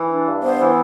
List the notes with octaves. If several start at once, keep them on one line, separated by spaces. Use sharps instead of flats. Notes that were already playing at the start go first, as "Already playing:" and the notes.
Already playing: E3
D4
G2
B3 C5
E3